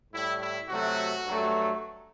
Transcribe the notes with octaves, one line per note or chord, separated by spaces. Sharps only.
A2 G3 E4
E4
C3 F#3 A3 F#4
G2 F#3 A3